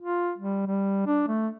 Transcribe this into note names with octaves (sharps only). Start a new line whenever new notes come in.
F4
G3
G3
D4
A3